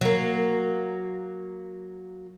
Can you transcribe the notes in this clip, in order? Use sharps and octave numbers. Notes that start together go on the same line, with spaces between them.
F#3 A#3